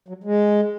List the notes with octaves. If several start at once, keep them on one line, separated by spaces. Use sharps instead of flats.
F#3
G#3